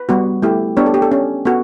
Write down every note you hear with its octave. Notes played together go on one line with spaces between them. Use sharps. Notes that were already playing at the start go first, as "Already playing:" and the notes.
Already playing: B4
G3 B3 F#4
A3 E4 G4
B3 D4 G4 C#5
A4
G4
A4
C#4 G4
B3 F#4 A4